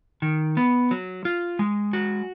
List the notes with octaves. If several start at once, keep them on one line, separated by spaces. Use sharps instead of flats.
D#3
B3
F#3
F4
G#3
F#4